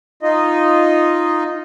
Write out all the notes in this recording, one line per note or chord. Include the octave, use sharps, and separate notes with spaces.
D#4 F4 D#5